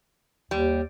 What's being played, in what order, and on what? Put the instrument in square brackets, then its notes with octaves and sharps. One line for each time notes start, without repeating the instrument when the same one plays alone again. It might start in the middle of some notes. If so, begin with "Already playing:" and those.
[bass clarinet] D#2 [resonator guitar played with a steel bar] G3